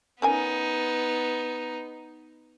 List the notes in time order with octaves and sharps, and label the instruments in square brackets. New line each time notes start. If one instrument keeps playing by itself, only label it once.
[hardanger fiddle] B3 D#4 [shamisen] C#4 A#4 G#5